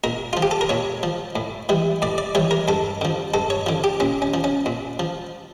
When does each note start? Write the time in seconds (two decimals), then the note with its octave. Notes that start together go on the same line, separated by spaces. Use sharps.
0.04 A#2 A#4
0.33 F3 F4
0.42 G4
0.51 A4
0.61 A#4
0.69 A#2 C#5
1.03 F3
1.36 A2
1.69 E3 G3
2.02 A2 D5
2.18 D5
2.35 E3 G3 C#5
2.51 A#4
2.68 G2 A4
3.01 D3 F3
3.34 G2 A4
3.50 C#5
3.66 D3 F3
3.84 G4
4.00 A#2 C#4
4.22 C#4
4.34 F3
4.44 C#4
4.66 A#2
4.99 F3